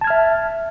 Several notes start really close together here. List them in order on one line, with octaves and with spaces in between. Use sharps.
A5 G#6 F6 E5